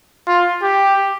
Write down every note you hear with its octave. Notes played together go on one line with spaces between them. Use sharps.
F4
G4